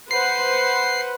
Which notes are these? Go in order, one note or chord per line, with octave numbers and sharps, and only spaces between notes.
B4 C5 F#5 C7